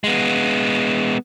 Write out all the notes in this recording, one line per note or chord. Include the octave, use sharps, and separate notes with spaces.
G#3 B3